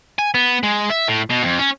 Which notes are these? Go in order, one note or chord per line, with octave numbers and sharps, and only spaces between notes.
G#5
B3
G#3
E5
A2
B2
F2
C#4